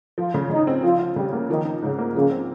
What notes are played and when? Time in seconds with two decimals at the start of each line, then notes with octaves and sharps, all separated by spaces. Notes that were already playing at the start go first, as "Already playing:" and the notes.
0.18 F3 F4
0.34 C#3
0.50 C#3 D#4
0.67 C4
0.83 F3 F4
0.99 F4
1.16 C#3 G3
1.33 A#3
1.49 D#3 F3
1.65 D#4
1.82 G#2 C#3
1.98 A#3
2.15 C#3 F3
2.31 C4